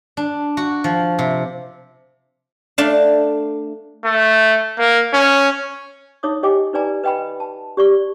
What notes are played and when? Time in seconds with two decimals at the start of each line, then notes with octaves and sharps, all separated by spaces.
0.17 D4
0.57 F#4
0.84 F3
1.19 C3
2.78 A3 D4 F5
4.04 A3
4.79 A#3
5.13 C#4
6.23 D#4 C#5 E5 D6 D#6
6.43 G4 C#5 D#5 G5 G#5 D6
6.73 D#4 B4 D5 G#5 A#5
7.04 B4 D#5 G5 G#5 B5
7.40 A5
7.77 G4 D5 C#6